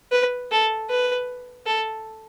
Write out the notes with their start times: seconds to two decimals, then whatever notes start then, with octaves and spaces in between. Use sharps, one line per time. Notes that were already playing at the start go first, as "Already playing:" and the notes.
0.12 B4
0.52 A4
0.90 B4
1.67 A4